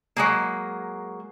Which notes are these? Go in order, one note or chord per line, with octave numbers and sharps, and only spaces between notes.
F#3 G#3 A#3